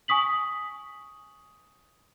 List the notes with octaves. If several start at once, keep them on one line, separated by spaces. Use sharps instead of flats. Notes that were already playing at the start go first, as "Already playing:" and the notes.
G#5 C#6 D#6 B6 F#7